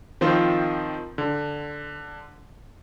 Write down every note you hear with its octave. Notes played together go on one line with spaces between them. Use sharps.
D#3 F3 C4 F4 C5
D3